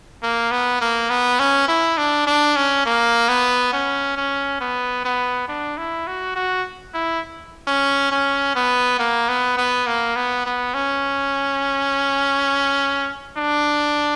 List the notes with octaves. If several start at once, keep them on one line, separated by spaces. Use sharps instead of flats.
A#3
B3
A#3
B3
C#4
E4
D4
D4
C#4
A#3
B3
C#4
C#4
B3
B3
D4
E4
F#4
F#4
E4
C#4
C#4
B3
A#3
B3
B3
A#3
B3
B3
C#4
D4